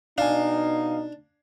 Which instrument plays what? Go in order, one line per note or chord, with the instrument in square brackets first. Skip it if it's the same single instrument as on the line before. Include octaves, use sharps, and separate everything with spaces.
[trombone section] B2 D#4 [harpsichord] D4 [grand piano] F5 G#5